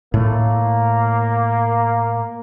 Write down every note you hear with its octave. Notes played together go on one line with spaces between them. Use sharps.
A2 A3 A#3